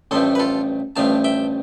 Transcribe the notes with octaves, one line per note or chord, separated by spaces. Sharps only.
A1 G2 F3 A3 A4 C5
B4
F4 A4
A1 G2 F3 A3 F5 A5
E5 G5